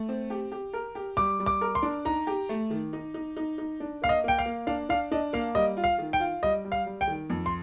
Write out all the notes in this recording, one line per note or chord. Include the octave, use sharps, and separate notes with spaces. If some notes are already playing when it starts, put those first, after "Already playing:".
Already playing: A3
C4
G4
G4
A#4
G4
G3 D6
G3
D6
A#4
C6
D4
D#4 A#5
G4
A3
D#3
D#4
D#4
D#4
D#4
D4
A#3 F5
D#5
A#3 G5
F5
A#3
D4 F5
D4 F5
D4 D#5
A#3 F5
G3 D#5
F4
F5
D#3
G5
F4
G3 D#5
G3
F5
G3
G5
D#3
F2
C6